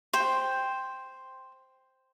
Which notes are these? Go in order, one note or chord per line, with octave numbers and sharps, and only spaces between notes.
C5 G5